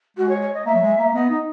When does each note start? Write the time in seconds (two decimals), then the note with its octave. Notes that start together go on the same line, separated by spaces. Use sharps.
0.17 G#3 F#4
0.29 C#5
0.42 C#5
0.54 D#5
0.66 A#3 E5
0.74 F#3
0.82 G#3
0.98 A#3
1.14 B3 D#5
1.30 D#4